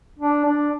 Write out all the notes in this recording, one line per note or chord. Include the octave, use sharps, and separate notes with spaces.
D4
D4